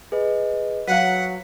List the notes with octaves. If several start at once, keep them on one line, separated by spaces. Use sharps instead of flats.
G#4 B4 D#5
F#3 B4 F5 F#5 B6